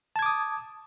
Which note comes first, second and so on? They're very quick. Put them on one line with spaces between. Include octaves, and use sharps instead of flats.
A5 G#6 D6 D#6